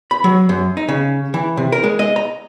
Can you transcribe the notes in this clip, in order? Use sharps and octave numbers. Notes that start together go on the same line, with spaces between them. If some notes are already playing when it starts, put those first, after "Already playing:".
B5
F#3
F#2
D#4
C#3
E3
C3
A#4
G#3
D#5
A#5